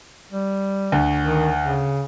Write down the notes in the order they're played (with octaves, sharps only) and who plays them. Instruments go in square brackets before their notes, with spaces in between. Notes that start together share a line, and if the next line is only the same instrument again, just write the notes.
[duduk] G3
[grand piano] D2
[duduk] D#3
C#3